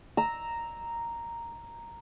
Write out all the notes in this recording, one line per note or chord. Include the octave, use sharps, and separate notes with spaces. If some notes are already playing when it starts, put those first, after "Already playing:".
A#5 E6